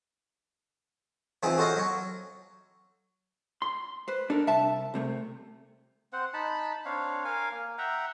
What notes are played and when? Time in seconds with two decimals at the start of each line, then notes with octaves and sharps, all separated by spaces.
1.43 E3 F3 C4 D#4 G#4
1.58 F#4 A4 C5 C#5 D#5 F5
1.76 F#3 C#5
3.62 C6
4.08 B4 C5
4.30 D4 A4 A#4
4.47 C2 E5 A5
4.94 C2 C3 A3
6.13 C4 C5 F#5
6.34 D#4 A5 B5
6.85 C4 D4 C#5 F5
7.25 A#4 F5 G#5
7.52 A#3
7.78 E5 F#5 G5 A#5